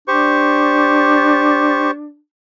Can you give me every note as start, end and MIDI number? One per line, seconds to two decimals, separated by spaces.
0.08 2.16 62
0.08 1.91 67
0.08 1.91 72
0.08 1.91 85